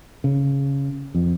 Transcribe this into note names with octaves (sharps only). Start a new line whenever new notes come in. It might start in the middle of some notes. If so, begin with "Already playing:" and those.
C#3
F2